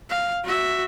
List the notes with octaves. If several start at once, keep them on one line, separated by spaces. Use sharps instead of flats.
F5
F#4 E5